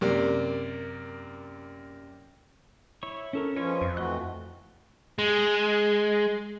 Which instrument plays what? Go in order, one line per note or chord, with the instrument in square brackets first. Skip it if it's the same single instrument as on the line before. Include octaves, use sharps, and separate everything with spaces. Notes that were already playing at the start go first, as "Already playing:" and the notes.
[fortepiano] F#2 C3 A#3 D5
[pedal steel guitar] E4 C#5 C#6
C#4 A4 A#4
[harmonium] F3 F4 [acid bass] C#4 [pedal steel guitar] B4 D#5 C#6
[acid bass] F2
[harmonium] E3 F#4 [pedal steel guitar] A3 D#5 F#6
[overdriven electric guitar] G#3